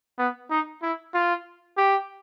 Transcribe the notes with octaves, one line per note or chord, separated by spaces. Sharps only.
B3
D#4
E4
F4
G4